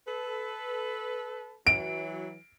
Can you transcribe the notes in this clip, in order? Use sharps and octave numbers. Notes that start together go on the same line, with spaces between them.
A4 B4
E3 F#3 D7